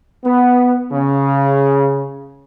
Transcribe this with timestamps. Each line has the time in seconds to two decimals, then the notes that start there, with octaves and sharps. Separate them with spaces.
0.24 B3
0.92 C#3